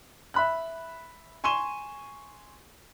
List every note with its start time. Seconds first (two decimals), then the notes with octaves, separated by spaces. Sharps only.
0.34 E5 B5 F#6
1.44 G#5 C6 C#6 D#7 E7 G7